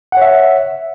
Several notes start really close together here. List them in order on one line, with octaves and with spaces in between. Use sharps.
F#5 C#5 E5